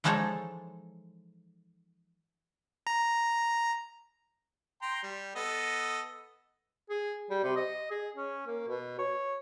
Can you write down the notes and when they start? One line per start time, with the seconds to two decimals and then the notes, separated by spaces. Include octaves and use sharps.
0.04 E3 F3 G#3 D#4 A4 C#5
2.87 A#5
4.82 G5 A#5 C6
5.03 G3
5.35 B3 A4 D#5
6.90 G#4
7.30 G3
7.44 C3
7.56 D#5
7.91 G#4
8.16 C#4
8.46 A#3
8.68 B2
8.99 C#5